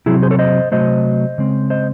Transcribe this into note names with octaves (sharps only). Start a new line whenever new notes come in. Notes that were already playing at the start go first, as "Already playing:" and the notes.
C3 F#3 C4 E4 G#4
G#4 C5
A4 C#5
C5 D#5
C3 F#3 A3 C5 D#5
C#3 G#3 C4
C5 D#5